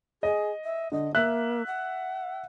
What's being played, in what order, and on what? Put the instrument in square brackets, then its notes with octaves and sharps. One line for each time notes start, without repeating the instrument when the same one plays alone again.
[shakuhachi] G#4 [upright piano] D#5
[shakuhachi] E5
[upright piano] D3 [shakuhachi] D#5
[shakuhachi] A#3 [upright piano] E5 F#6
[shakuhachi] F#5